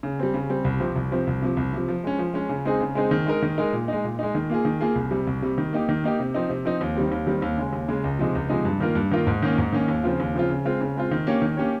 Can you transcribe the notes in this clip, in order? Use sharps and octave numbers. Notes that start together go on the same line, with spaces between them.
C#3
G3 C4
C#3
G3 C4
C2
C3 F3 C4
C2
C3 F3 C4
C2
C3 F3
C2
C3 F3
F3
G#3 C#4
F3
G#3 C#4
C#3
G#3 C4 D#4 G#4
C#3
G#3 C4 D#4 G#4
D#3
G#3 D#4 A#4
D#3
G#3 D#4 A#4
A#2
G#3 D#4
A#2
G#3 D#4
D#3
A#3 F4 G#4
D#3
A#3 F4 G#4
C2
C3 G3
C2
C3 G3
D#3
A#3 D#4 G4
D#3
A#3 D#4 G4
C3
F3 C4 D#4
C3
F3 C4 D#4
D#2
D#3 G3 C4
D#2
D#3 G3 C4
D#2
C#3 G#3
D#2
C#3 G#3
C#2
C3 F3 G#3 D#4
C#2
C3 F3 G#3 D#4
G2
D#3 A#3 F4 A#4
G2
D#3 A#3 F4 A#4
G#2
D#3 A#3 C#4
G#2
D#3 A#3 C#4
D#2
C#3 F3 C4 F4
D#2
C#3 F3 C4 F4
C#3
G#3 C4 F4
C#3
G#3 C4 F4
D#3
A#3 C#4 G4 C#5
D#3
A#3 C#4 G4 C#5